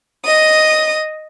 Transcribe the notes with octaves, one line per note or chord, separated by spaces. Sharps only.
D#5 D#6